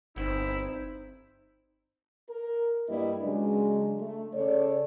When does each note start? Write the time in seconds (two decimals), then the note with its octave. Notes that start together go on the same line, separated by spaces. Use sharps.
0.16 G1 C4 D#4 E4
2.30 A#4
2.89 G2 G3 A#3 E4 B4 D#5
3.22 C#3 F#3 G#3 D4
4.00 A3
4.34 C#3 A4 C#5 D5